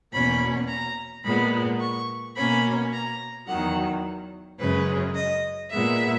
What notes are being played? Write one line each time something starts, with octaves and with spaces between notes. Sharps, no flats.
E2 B2 A#3 C#4 B5
A#5
A#2 G#3 B3 B5
C#6
B2 A#3 C#4 B5
A#5
E2 D#3 F#3 F#5
F#2 C#3 G#3 C#4 B4
D#5
A#2 G#3 B3 E5